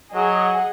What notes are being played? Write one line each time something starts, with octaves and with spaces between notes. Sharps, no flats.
F#3 G#4 D#5 F#5